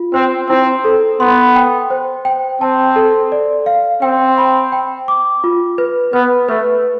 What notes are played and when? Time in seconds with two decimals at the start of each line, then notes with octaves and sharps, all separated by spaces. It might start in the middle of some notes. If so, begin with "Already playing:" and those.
Already playing: F4
0.14 C4 C5
0.49 C4 E4
0.85 A4
1.20 B3 C6
1.56 G5
1.90 C5
2.25 G5
2.61 C4 A5
2.96 A4
3.32 D5
3.66 F5
4.02 C4 G5
4.38 B5
4.72 G5
5.08 D6
5.44 F4
5.78 B4
6.13 B3 B4
6.49 A3 B4